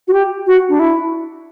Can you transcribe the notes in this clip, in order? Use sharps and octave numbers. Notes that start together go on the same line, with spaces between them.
F#4
G4
F#4
D4
E4